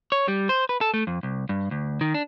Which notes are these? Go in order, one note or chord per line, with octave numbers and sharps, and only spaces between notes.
C#5
G3
C5
B4
A4
A3
F2
C2
G2
D2
D#3
D4